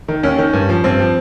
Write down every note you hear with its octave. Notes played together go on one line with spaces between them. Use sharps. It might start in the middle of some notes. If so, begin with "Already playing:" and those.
D#3
D#2 C#4
D#3
G2
F3
G2 C4
F3